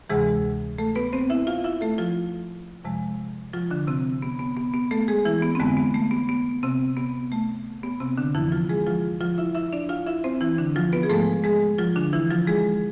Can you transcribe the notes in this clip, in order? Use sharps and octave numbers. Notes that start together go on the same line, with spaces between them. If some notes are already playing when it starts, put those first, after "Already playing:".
D2 C3 E3 G#3 G#4
A3 A4
B3 B4
C4 C5
E4 E5
F4 F5
E4 E5
A3 A4
F3 F4
F2 C3 F3 G#3
F3 F4
D3 D4
C3 C4
B3
B3
B3
B3
A3 A4
G#3 G#4
E3 E4
B3
C4
F2 D3 G#3 B3
B3
A3
B3
B3
C3 C4
B3
A3
B3
C3 C4
D3 D4
F2 D3 E3 F3 E4
F3 F4
G#3 G#4
F3 F4
F3 F4
E4 E5
E4 E5
D4 D5
F4 F5
E4 E5
C4 C5
E3 E4
D3 D4
F3 F4
B3 B4
G#4
G#2 F3 G#3 A3 A4
G#3 G#4
F3 F4
D3 D4
E3 E4
F3 F4
G#3 G#4